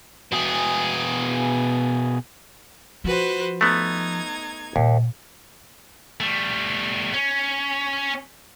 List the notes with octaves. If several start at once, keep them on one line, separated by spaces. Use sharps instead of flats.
B2 G#4
F3 F#4 B4 C5
A3 B3 D#4 G#6
D#2 A#2
G3 A3
C#4